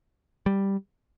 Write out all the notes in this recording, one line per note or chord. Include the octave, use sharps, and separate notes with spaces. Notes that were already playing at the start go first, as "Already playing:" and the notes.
G3